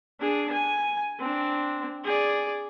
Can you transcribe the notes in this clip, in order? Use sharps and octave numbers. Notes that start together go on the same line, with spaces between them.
D4 G#4
G#5
C4 D4
G#4 D5